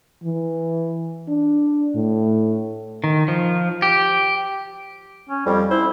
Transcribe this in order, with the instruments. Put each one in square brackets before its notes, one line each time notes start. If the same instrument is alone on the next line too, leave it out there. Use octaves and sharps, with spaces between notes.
[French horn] E3
D4
A2
[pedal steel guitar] D#3
F3
G4
[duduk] C#4
[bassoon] F2 [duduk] G3
[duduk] E4 [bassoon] C5